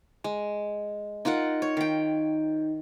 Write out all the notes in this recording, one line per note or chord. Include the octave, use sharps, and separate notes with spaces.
G#3
D#4 F4 A#4 F#5
C#5
D#3 G5